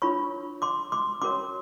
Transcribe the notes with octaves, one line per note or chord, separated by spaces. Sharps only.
D4 F4 A#4 C#5 B5 C#6
C6 D6
C6 D6
C#4 F#4 A#4 C#5 C6 D6